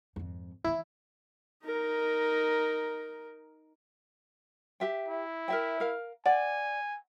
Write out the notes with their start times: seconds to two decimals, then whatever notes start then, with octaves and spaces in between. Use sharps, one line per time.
0.16 G#1 F2
0.64 E3 F3 E4
1.64 D#4 A#4
4.80 G4 E5 G5
5.08 E4
5.48 A#4 E5 G5
5.80 A#4 F5
6.26 D5 F#5 G#5